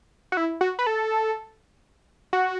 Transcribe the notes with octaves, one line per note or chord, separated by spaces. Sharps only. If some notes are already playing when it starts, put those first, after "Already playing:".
F#4
E4
F#4
B4
A4
F#4